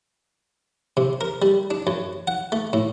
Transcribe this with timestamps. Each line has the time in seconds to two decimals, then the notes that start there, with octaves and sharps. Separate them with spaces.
0.97 C3
1.21 A#4
1.42 G3
1.71 D4
1.87 F#2
2.27 F#5
2.52 A3
2.73 A2